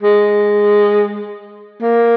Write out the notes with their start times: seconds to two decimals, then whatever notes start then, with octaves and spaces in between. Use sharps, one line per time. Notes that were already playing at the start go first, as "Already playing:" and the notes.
0.02 G#3
1.82 A#3